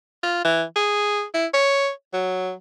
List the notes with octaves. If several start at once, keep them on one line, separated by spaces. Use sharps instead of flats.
F4
E3
G#4
E4
C#5
F#3